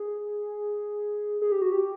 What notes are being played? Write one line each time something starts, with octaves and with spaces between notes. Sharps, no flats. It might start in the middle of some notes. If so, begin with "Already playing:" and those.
Already playing: G#4
G#4
G4
F#4
G4